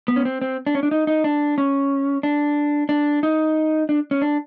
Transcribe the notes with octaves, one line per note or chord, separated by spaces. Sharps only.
B3
C#4
C4
C4
D4
C#4
D4
D#4
D#4
D4
C#4
D4
D4
D#4
D4
C#4
D4